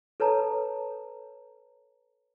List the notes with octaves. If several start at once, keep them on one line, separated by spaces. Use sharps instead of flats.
A4 B4 C#5 A5 A#5